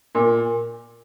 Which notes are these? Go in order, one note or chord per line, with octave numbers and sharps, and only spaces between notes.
A#2